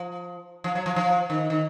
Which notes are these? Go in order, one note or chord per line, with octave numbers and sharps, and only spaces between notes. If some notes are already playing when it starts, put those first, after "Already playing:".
Already playing: F3
F3
F#3
F3
F3
D#3
D#3